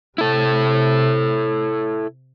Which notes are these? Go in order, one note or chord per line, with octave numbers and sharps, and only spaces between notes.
C3 E4 A4